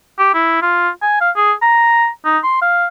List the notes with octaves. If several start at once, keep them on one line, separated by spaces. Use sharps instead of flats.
G4
E4
F4
G#5
F5
G#4
A#5
D#4
C6
F5